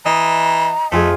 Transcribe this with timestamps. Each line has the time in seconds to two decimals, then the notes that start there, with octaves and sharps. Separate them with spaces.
0.05 E3 D#5 A#5
0.92 F2 A3 F4 G#4 G#5